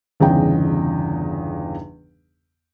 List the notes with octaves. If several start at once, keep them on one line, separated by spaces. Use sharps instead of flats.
G1 E2 C#3 D#4 G5